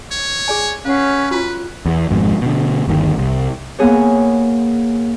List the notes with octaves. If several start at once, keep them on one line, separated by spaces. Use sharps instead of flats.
C#5
G#4 D5 G#5
C#4 B4 F5 F#5
F4 F#4 B4
E2
G#1 F2 G#2 B2
B2 D3
G1 D#2 D#3
C2
A#3 B3 G#4 C#5